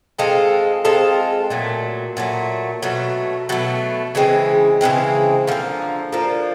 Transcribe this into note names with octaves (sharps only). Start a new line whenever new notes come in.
G#3 C4 F4 A4
G#3 C4 F4 A4
A#2 F#3 A3
A#2 F#3 A3
B2 F#3 A3
B2 F#3 A3
C#3 E3 G#3 C4
C#3 E3 G#3 C4
D3 F3 A#3
D3 F3 A#3